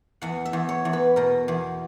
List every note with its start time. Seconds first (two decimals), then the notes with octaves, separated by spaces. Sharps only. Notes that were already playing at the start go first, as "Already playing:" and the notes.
0.22 E2 F#5
0.45 E5
0.53 E2
0.69 C#5
0.85 E2
0.93 B4
1.16 B2 A#4
1.48 E2